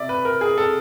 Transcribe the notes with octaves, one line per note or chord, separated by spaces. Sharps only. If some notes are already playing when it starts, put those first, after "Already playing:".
Already playing: C3 D5 E5
B4
A#4
G#4
A4